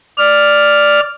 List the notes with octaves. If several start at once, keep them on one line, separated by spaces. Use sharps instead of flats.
D5 F6